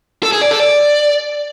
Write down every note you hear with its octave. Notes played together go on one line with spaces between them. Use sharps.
A4
G#4
D5
A4
D5